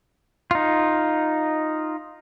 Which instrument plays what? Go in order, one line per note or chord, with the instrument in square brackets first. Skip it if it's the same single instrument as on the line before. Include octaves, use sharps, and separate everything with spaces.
[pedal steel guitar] D#4 F4